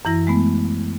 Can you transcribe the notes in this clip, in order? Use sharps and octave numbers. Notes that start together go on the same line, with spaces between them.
F#2 E3 E4 A#6
G#3 A3 B3